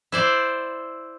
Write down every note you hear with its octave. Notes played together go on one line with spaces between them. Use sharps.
E4 C5 D5